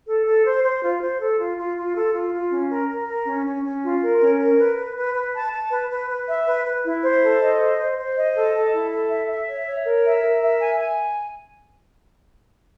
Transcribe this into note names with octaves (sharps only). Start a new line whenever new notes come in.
A4
A4
C5
C5
F4
C5
A4
F4
F4
F4
A4
F4
F4
C#4
A#4
A#4
A#4
C#4
C#4
C#4
F4
A#4
C#4
A#4
B4
B4
B4
B4
A5
A5
B4
B4
B4
E5
B4
B4
E4
C5
A4
D#5
C5
C5
C5
D#5
A4
A4
E4
A4
E5
E5
C#5
C#5
A#4
E5
A#4
E5
G#5
G#5